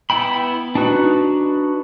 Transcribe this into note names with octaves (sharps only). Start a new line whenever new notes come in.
B3 E4 G5 B5
D4 D#4 F#4 B4